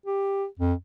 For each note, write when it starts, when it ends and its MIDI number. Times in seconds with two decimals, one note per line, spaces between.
0.06 0.46 67
0.59 0.73 41